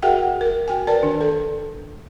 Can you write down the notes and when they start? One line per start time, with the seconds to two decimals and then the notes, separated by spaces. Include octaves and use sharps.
0.02 F#4 G#4 A#4 E5 F#5 G5
0.41 A#4
0.68 F#4 G5 G#5
0.87 A#4 B4 D5 A5
1.02 D#3 D4
1.21 A4